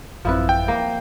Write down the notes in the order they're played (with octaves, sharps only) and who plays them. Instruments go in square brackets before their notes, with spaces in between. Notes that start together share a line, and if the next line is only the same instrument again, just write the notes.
[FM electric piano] A1 F#2 C4 [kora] F3 E4 B4
[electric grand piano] G5
[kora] A#3